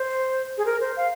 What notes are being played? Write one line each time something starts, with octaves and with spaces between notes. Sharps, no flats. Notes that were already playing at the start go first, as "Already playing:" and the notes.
Already playing: C5
G#4
A#4
C5
F5